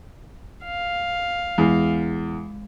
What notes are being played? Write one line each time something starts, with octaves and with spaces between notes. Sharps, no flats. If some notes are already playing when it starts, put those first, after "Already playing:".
F5
E2 G#3